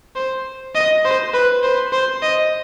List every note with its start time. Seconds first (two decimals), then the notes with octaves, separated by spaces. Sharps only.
0.16 C5
0.75 D#5
1.05 C5
1.33 B4
1.63 C5
1.92 C5
2.23 D#5